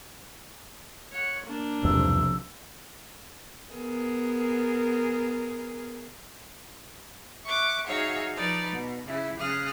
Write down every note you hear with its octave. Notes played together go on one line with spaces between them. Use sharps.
C#5 F#5
A#3 D4
B1 E2 G2 C3 E3 F3 E6
B3 G#4 A#4
E5 C#6 D6 F#6
D#4 F#4 G#4 C#5 E5 F5
F3 D#4 B4 D5
B2
C#3 E4
C#3 F5 D#6 F6 F#6